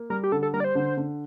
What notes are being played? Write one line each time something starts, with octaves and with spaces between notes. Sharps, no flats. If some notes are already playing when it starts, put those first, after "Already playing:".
Already playing: A#3
G3 A#4
G4
D3 A4
A4
G3 A#4
D5
C5
D3
D3